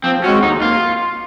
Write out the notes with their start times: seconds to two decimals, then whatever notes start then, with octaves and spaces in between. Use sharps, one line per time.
0.04 F3 C4
0.23 G#3 C4 C#4 F#4
0.42 D#2 D#4
0.62 A#3 F4